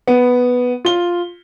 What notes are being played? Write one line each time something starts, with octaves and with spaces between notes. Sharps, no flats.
B3
F4 G7